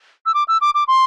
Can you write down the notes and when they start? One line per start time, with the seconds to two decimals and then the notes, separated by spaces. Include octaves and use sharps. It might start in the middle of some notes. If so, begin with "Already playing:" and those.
0.26 E6
0.34 D6
0.48 E6
0.61 D6
0.74 D6
0.88 C6